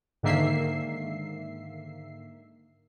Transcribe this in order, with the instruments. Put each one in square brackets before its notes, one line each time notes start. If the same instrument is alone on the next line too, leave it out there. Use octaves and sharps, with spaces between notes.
[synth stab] G#2 D3 D#3 A#3 E5 C7